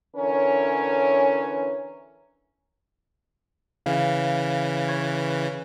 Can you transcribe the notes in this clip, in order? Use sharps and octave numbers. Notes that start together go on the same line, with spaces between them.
D3 E3 C#4 A#4 C#5
C#3 E3 F5
B4 C#6 G#6